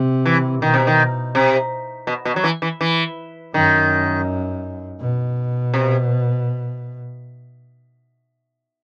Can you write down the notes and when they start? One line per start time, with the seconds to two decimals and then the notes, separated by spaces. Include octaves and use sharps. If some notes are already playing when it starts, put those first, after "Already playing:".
Already playing: C3
0.26 E3
0.62 B2 D#3
0.74 C3
0.87 D#3
1.35 C3
2.07 B2
2.25 B2
2.36 F#3
2.44 E3
2.62 E3
2.81 E3
3.54 F#2 D#3
5.00 B2
5.74 C3